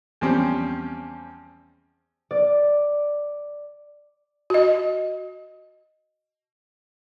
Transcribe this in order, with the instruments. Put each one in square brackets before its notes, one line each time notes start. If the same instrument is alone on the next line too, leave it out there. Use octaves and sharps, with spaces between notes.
[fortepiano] E2 F3 G3 C4 C#4
[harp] D5
[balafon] F#4 D#5